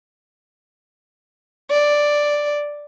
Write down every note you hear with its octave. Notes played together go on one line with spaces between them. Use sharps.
D5